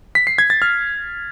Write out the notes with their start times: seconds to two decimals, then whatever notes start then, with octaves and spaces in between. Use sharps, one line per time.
0.15 B6
0.27 C7
0.38 G#6
0.50 A6
0.62 F6